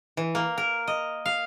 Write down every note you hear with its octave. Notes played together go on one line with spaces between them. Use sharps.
E3
A#3
A#4
D#5
F5